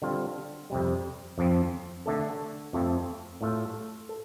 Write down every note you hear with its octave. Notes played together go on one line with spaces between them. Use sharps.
D3 G3 C4 F4
F2 C3 G3
F2 F3 C4
D3 A3 D4 A4
F2 F3 A3 C4
A2 A3 F4 A4
A4